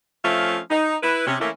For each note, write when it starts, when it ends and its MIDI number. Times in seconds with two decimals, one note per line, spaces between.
0.24 0.58 53
0.24 0.58 57
0.24 0.58 60
0.24 0.58 61
0.24 0.58 76
0.24 0.58 77
0.70 0.96 63
1.03 1.23 64
1.03 1.23 71
1.26 1.35 48
1.26 1.35 61
1.40 1.49 52
1.40 1.49 57
1.40 1.49 58
1.40 1.49 61
1.40 1.49 64